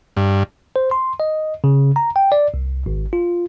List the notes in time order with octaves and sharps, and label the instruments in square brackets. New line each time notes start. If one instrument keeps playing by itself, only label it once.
[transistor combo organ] G2
[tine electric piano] C5
C6
D#5
C#3
A#5
G5
D5
C2
G#1
F4